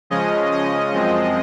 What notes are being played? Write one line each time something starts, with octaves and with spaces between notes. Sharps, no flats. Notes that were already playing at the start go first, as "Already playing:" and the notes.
C#3 F3 G#3 C#4 D#5
D#5
F#2 F3 G#3 C4